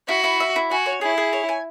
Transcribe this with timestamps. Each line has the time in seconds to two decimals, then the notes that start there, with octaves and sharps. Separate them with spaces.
0.08 E4 F#4
0.24 E4
0.40 E5
0.56 E4
0.71 F#4 G#5
0.86 C#5
1.01 E4 G#4
1.18 G#4
1.33 C#5
1.49 G#5